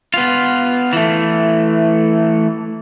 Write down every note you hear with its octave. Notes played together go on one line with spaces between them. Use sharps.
B3 F4
E3 A3